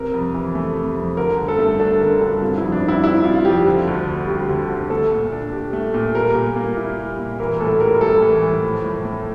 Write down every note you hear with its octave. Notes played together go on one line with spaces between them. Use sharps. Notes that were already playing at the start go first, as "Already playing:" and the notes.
Already playing: C3 A#4
F2
E3
A3
C3
F2
D3 A#4
G2
A4
A3
D4 A4
D3 A#4
G2 A4
C3 F4
E4
F2
D4
G3
E4
C4 E4
C3 F4
F2 G4
D3
D2
G3
D2 G4
D3
D2
A3 A4
A#2
D4
G4
A3
A#2
G3 A#4
A#2
A#3
E4
G3
A#2
E3 A#4
A2 A4
G3 A#4
A2 A4
E3
A2
F3
A2
A3